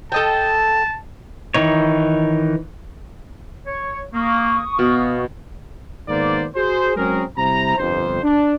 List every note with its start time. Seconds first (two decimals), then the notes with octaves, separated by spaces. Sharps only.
0.12 A4 D#5 G5 A5
1.54 D#3 E3 D#4 C#5
3.66 C#5
4.14 A#3 C#6 D#6
4.79 B2 B3 F5
6.09 G#2 D#3 A#3 B3 C5 D5
6.56 F#4 G#4 C5
6.96 F#3 G#3 C4 C#4 G#4 A#4
7.38 C3 G3 E4 C5 A#5
7.78 G1 F2 C5
8.23 D4